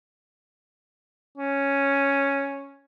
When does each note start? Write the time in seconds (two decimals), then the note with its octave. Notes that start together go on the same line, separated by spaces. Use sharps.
1.38 C#4